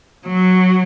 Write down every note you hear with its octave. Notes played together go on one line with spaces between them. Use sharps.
F#3